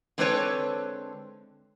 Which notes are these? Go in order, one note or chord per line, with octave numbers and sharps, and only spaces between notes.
D3 G#3 C4 A4 B4 C#5